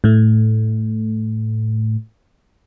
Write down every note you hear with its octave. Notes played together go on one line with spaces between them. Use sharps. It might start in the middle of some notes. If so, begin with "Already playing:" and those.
A2 A3